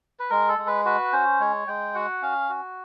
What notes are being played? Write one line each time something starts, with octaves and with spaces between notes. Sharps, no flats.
B4
G#3 A#4
A4
G#3
B4
F#4 B4
C#4 C5
G#3 C#5
G#3 G5
F#4 F#5
C#4 F5
F#4